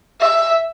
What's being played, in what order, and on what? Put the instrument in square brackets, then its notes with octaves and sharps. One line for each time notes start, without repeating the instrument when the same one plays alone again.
[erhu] E5